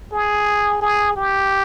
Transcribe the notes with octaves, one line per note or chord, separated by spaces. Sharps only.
G#4
G#4
G4